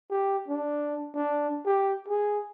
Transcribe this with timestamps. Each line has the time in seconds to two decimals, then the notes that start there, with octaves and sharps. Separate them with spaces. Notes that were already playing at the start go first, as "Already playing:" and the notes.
0.11 G4
0.48 D4
1.15 D4
1.66 G4
2.08 G#4